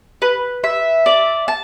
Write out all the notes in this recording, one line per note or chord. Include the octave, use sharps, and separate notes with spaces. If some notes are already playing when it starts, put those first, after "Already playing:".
B4
E5
D5
A5